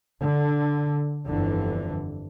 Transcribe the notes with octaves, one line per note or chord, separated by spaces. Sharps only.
D3
G1 F2 D3 E3